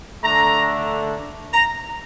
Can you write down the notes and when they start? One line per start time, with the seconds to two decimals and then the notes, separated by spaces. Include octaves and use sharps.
0.23 D3 A3 D4 A#5
1.54 A#5